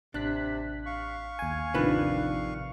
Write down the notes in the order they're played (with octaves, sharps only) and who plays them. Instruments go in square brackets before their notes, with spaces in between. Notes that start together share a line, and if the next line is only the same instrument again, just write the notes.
[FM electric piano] A1 F#6 B6 [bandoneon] C3 [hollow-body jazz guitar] D4
[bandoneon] F5 C#6
[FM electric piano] D#2 G#5
[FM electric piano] A1 D#3 F3 [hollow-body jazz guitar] C3 D4 B4